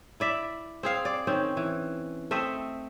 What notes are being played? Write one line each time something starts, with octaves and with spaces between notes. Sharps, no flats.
E4 D5 E5
C4 G#4 F5
D5
D#3 C4 C#4
E3
A3 C4 D#5 E5